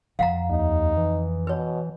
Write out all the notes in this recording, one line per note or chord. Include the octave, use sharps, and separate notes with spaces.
F2 F5 F#5 A#5
D#2 D#4
E3
B2 B4 C#5